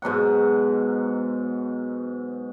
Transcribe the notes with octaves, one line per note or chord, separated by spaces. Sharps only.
G#2 B2 F#3 F#5